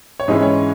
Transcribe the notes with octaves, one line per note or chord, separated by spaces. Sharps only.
C#5
G#2 E3 G#3 C#4 E4 D#5
C#5